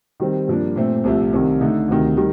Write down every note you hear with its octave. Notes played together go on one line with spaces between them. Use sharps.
D#3 G3 C4
G2 F3 A#3 D4
A#2 A3 C4
C2 C3 F3 A3
C2 C3 D#3
D3 A3 D#4
D2 C3 D#3
D#3 G3